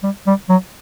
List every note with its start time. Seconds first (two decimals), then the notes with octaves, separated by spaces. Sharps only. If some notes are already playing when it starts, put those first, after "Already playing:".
0.03 G3
0.27 G3
0.49 F#3